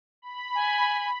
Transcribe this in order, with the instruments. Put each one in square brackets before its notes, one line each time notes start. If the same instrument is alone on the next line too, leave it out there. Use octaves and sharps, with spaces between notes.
[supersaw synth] B5
[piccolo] G#5